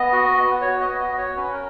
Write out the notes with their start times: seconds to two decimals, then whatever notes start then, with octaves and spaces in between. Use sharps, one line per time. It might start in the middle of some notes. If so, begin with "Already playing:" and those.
Already playing: B3 D#5
0.12 F#4
0.37 B3
0.61 F#4 C#5
0.81 D#5
0.87 B3
1.00 D#5
1.13 F#4
1.18 C#5
1.36 C#4 B4
1.53 A#4